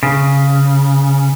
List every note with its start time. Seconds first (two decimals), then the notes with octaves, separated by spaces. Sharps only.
0.03 C#3